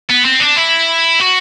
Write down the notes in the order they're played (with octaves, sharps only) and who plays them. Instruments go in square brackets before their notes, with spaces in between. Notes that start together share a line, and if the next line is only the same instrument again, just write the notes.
[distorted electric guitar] B3
C4
D4
E4
F#4